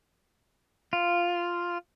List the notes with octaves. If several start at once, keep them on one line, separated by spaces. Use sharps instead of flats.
F4